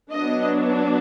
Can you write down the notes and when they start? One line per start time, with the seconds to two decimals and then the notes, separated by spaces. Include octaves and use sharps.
0.12 F#3 B3 D4 D#5